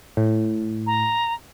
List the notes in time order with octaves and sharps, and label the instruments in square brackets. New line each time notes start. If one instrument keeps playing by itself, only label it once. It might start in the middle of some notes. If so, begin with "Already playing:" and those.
[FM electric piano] A2
[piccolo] A#5